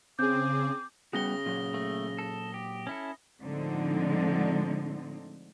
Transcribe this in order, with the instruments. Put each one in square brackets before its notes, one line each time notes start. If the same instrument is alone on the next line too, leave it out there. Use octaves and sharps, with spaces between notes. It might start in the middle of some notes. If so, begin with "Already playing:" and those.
[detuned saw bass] C#3 [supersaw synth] C4 G#4 [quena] D6 [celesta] G6
[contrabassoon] C#3 [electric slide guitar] G3 B3 F#4 [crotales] D#6 A#6 G7
[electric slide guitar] A#2 F#3
[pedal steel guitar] A3
A4
G4
C#4 E4 A4
[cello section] A2 D3 F3 G#3 C4 D#4